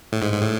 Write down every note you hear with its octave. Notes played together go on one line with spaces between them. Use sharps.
A2
G#2
G#2
A2